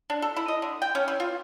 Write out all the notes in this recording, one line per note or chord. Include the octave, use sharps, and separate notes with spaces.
D4
A4
E4
D#5
D3
G5
C#4
E3
F4